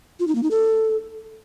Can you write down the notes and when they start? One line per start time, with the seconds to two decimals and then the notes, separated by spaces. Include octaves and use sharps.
0.20 F4
0.28 D#4
0.35 A#3
0.43 D#4
0.51 A4